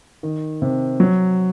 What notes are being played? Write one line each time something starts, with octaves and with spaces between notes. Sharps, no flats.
D#3
C3
F#3